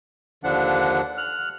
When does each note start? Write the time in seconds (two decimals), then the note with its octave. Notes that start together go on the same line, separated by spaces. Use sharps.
0.44 D#2 D3 F3 D4 F#5
1.17 F6 F#6